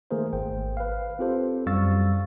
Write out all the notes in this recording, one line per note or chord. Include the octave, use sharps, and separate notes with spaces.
D#3 A3 A#3 G#4 A#4 C5
G#1 C5 G5
B4 F5
C4 F4 G4 A4 C5
F#2 G3 F5 C#6 E6 A6